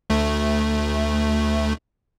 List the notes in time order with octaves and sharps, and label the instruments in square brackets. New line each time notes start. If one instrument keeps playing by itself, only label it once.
[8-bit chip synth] D2 A3